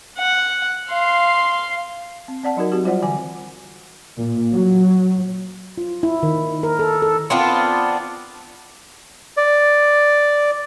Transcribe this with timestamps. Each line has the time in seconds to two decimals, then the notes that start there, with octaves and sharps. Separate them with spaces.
0.18 F#5
0.90 F5 C6
2.28 C4
2.44 C4 D5 F#5 A5
2.57 F#3 D#4 F#4 A#4
2.72 C4 F#4 G4
2.84 G3 F4 C5 D5 F#5
3.02 D3 E3 G#5 D6
4.17 A#2
4.54 F#3
5.78 F4
6.03 E4
6.23 D#3
6.63 A#4
6.79 A4
7.02 A4
7.30 B3 C4 D4 F4
9.37 D5